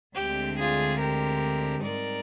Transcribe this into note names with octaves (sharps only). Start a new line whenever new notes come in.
D2 D3 G#3 C4 G4
F4 G#4
G4 A#4
G#2 G3 C4 D#4 A#4 D5